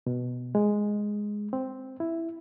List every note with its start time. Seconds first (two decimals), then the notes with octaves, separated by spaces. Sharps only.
0.07 B2
0.55 G#3
1.53 C4
2.00 E4